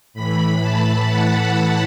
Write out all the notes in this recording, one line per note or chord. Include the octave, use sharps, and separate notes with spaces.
A2 E3 B5
A5
F#5
F#5